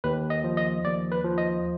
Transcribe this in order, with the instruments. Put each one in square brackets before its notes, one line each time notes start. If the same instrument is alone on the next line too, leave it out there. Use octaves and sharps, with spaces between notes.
[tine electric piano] D#2 B4
D#5
F3
D#5
D#2 D5
B4
F3
D#5